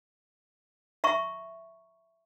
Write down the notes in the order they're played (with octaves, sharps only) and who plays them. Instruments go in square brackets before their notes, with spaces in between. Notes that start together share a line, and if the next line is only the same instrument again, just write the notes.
[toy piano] E5 A#5 C#6